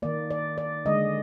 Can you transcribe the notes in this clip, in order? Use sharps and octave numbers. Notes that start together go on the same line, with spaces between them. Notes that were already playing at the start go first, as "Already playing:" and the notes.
D#3 A#3 D5
D5
D5
D3 G#3 D#5